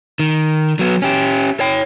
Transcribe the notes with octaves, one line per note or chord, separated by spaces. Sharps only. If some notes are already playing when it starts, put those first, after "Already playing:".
D#3
F#3 B3
C#4 G4
C#5 G5